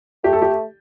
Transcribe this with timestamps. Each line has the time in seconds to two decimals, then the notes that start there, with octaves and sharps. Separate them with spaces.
0.24 A3 G4
0.33 A4
0.42 G4